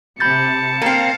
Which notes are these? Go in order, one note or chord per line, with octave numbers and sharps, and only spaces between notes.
C3 A5 B5 G6 A6 C#7
A#3 C4 F5